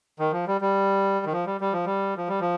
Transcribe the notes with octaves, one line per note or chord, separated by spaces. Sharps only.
D#3
F3
G3
G3
D#3
F3
G3
G3
F3
G3
F3
G3
F3